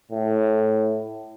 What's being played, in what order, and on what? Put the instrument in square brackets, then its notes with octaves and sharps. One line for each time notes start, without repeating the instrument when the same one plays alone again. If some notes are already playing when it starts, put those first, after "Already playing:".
[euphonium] A2